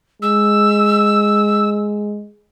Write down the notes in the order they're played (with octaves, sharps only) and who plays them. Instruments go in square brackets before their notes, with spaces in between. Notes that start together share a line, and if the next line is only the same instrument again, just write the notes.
[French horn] G#3 [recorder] E6